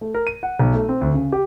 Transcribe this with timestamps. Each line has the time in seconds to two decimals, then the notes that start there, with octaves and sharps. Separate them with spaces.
0.01 A3
0.14 A#4
0.27 D#7
0.43 F#5
0.60 B1
0.74 A3
0.89 C4
1.01 D2
1.14 C#3
1.32 G4